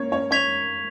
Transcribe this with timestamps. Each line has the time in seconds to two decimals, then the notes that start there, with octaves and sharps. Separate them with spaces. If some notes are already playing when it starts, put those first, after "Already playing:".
Already playing: A#3 C#4 C#5
0.12 C#4 C#5
0.31 C#4 C#5 C#6 G#6 B6 F7